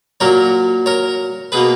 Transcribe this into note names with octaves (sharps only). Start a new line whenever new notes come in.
A#2 F#3 A#3 A#4 C#5
A#4 C#5
B2 A#3 G#4 B4